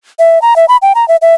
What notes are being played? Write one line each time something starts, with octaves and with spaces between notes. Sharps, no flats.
E5
A#5
E5
B5
G5
A#5
E5
E5